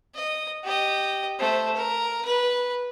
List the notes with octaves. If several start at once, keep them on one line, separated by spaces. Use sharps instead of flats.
D#5
G4 D#5
A3 C5
A#4
B4